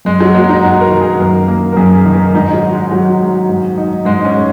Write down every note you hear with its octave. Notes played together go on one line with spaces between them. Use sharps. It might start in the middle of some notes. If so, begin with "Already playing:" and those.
F#2 G#3
F#3
G#3 A#3
D#4
F#2 F#4
A#4
D#3
G#4
F#2 A#4
A#3
A#4
F#2 G#4
G#4
D#3
A#4
G#2 D#4
F#3
D#4
G#3
G#2 F#3
G#3
G#2
D#4
G#2 G#3
C#4
G#3